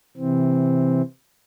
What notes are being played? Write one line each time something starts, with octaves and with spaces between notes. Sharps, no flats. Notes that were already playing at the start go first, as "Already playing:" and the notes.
C3 E3 C4